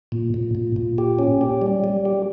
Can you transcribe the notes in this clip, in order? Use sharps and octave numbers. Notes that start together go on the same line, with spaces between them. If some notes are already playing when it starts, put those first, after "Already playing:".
A#2
A#2
A#2
A#2
G4
C#4
G4
G3
G3
G4